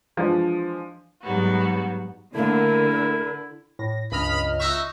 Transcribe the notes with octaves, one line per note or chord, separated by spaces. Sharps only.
E3 F3 G#3 D4
G#2 F#3 G3 B3 F#4
D3 A3 A#3 E4 A#4
A2 A#6
C#2 G2 D#5 B5 F6
D#4 F#4 E5 C#6